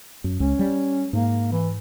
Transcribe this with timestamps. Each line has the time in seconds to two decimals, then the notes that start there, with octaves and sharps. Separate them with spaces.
0.24 F#2
0.40 C#2 C#4
0.59 G3
1.13 G#2 A#3
1.52 E3